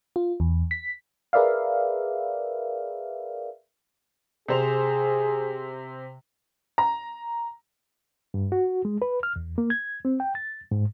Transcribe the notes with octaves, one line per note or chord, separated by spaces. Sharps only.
F4
E2
B6
G#4 A#4 B4 D5 E5 F5
C3 G#4 C5 F7
A#5
G2
F#4
G#3
B4
F6
E2
A#3
G#6
C4
G5
A6
G#2